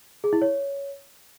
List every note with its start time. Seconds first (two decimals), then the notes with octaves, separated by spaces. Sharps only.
0.24 G#4
0.33 E4
0.42 C#5